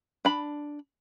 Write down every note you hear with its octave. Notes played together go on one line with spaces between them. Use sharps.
D4 B5